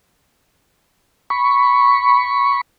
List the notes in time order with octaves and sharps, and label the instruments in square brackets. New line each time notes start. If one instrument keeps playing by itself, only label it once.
[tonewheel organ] B5 C#6